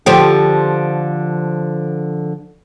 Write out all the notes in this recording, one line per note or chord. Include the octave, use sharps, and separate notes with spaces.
D3 F3 G4